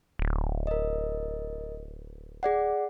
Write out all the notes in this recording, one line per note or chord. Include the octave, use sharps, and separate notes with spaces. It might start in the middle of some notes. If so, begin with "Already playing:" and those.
D1
A#4 D#5
G#4 D5 F#5